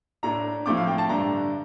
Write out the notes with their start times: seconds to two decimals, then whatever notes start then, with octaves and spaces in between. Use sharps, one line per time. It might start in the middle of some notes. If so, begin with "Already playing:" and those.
0.23 A2 A3 D4 A#5
0.66 A2 F3 A3 C4 D6
0.77 F5
0.87 G5
0.98 A5
1.09 G2 D3 A3 D4 A#5